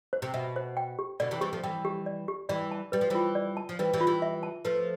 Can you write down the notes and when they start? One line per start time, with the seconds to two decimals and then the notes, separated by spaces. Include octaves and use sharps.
0.13 C5
0.22 C3
0.34 B2 E5
0.56 C5
0.77 G5
0.99 G4
1.20 B2 D3 D5
1.31 C3 E3
1.41 E3 G3 G4
1.53 F3 A3
1.64 E3 G3 G5
1.85 G4
2.06 D5
2.28 G4
2.49 E3 G3 D5
2.71 A5
2.92 G3 B4
3.01 F3
3.10 E3 G3 F4
3.35 D5
3.57 A5
3.69 F3
3.79 E3 G3 B4
3.93 E3 G3
4.01 F4
4.07 E3 G3
4.22 E5
4.43 A5
4.65 F3 A3 B4